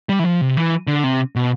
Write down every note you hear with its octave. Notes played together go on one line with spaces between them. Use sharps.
G3
E3
F3
C3
E3
D3
C3
B2